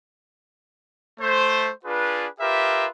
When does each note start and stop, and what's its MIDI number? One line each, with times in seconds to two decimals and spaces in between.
1.20 1.71 57
1.20 1.71 72
1.85 2.27 62
1.85 2.27 65
1.85 2.27 68
1.85 2.27 71
2.41 2.87 65
2.41 2.87 67
2.41 2.87 70
2.41 2.87 71
2.41 2.87 76